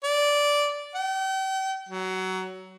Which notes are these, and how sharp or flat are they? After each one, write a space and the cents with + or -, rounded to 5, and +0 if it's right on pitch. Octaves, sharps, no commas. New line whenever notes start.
D5 -10
G5 -40
F#3 +20